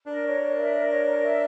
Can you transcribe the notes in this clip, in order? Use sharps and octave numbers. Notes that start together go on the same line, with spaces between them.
D4 A#4
C#5
A#4
E5
A#4
C#5
A#4
E5